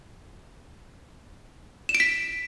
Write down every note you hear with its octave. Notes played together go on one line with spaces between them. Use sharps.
E7
D7
B6